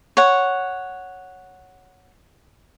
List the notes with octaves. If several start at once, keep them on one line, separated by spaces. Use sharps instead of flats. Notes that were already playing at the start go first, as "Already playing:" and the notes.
C#5 F#5